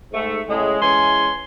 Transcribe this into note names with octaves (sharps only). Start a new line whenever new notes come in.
G#2 A3
A2 C#3 G#3
E3 G#3 C#4 G#5 C6